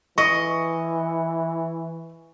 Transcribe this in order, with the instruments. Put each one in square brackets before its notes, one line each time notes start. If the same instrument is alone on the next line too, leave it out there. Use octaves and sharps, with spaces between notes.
[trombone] E3 [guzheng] D#5 [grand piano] C#6